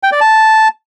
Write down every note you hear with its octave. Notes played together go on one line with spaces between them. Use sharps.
G5
D5
A5